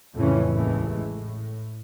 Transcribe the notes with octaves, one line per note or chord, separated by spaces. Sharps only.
F2 A2 C#3 E3 C#4
A1 D#2 E3 G#3 A3
A2